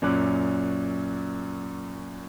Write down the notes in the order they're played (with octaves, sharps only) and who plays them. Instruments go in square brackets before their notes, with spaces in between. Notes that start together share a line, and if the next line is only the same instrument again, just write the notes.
[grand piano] F#2 A#2 C#4 D6 F#6